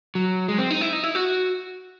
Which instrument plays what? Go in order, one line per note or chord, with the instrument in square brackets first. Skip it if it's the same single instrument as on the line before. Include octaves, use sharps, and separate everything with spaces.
[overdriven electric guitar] F#3
G#3
C4
D#4
E4
D#4
E4
F#4